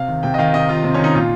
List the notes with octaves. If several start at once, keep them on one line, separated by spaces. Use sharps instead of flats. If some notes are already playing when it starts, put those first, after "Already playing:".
Already playing: C3 F5
D#3
C3 G5
D#5
D#3 F5
C3 D#5
D#3 F4
C3 C4
C#4
D#3
D#4
A#2 F4